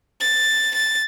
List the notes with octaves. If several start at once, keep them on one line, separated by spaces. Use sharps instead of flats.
A6
A6